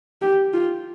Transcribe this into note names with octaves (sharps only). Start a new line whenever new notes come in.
G4
F4